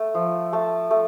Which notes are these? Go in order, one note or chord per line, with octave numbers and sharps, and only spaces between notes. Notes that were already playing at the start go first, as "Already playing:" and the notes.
Already playing: A3
F3
A3 A5
A3